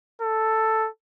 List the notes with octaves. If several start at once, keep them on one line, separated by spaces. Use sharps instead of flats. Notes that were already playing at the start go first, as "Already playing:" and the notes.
A4